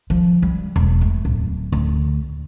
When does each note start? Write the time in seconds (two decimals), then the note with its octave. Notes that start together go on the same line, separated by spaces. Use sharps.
0.10 F3
0.42 G3
0.76 E1
1.01 A3
1.25 D1
1.72 D2